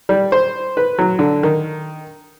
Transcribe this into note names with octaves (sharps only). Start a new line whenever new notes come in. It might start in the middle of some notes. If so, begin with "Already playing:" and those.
G3
C5
B4
F#3
D3
D#3